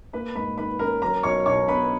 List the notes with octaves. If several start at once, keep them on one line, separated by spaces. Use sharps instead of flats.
A#3 B4 B5
G#2 B4 B5
D#3 B4 B5
C#4 A#4 A#5
F#3 A#4 A#5
B1 C#5 C#6
B2 C#5 C#6
B3 B4 B5